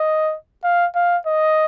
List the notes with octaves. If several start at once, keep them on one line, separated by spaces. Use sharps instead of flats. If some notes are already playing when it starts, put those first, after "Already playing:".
Already playing: D#5
F5
F5
D#5